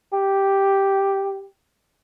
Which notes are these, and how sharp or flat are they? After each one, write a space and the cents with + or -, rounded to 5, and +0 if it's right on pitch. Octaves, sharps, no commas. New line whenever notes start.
G4 +0